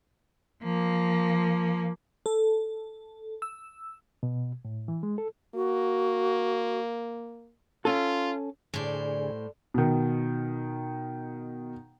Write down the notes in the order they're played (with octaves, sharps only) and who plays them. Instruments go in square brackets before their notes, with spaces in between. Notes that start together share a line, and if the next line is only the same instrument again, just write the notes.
[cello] F3 A#3
[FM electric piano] A4
E6
[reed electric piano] B2
A2
E3
G#3
A4
[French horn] A#3 [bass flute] F#4
[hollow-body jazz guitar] C#4 A4 [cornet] F4
[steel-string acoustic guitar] A2 C5 [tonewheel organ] D3 G#4 [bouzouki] G3 A4 D5
[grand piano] B2 D#3